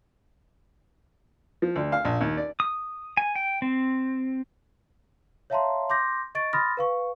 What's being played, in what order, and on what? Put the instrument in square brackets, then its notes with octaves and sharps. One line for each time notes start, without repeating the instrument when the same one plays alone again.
[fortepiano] F3
D2
F5
A#1
D#2
D5
[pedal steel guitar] D#6
G#5
G5
C4
[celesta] C#5 E5 F5 A5 A#5 C6
C6 D6 G6 A#6
D#5 C#6 A6 D7
B5 C6 D#6 F6 A6 A#6
B4 F5 C#6